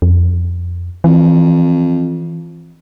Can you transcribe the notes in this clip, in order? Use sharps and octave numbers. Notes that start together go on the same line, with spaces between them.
F2
F2 E3